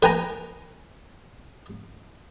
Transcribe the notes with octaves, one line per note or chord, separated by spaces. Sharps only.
B4 G5 G#5 A#5